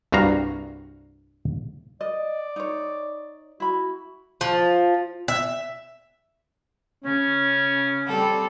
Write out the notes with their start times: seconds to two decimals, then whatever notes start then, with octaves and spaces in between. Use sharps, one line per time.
0.12 C2 G2 F#4 F5 A#5
2.01 D5 D#5
2.56 D#4 C#5
3.60 E4 F#4 B5
4.41 F3
5.28 E5
7.04 C#3 C#4
8.08 G3 C4 A4